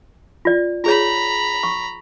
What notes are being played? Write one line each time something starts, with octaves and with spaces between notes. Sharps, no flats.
F4 D5
F4 G#4 C#5 A#5 B5
C#6